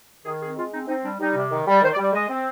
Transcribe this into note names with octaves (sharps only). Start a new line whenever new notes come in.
D#3 G#4
C4 G#4
G#3 F4
C4 D#4
C4 D#4
G3 D4
G3 D#4
C3
D#3
G3
D#3 C5
D5
G3
D5
G#3 D#5
C4